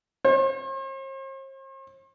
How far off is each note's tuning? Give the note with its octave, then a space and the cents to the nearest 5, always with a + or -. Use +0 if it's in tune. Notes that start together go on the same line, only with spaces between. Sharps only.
C5 +45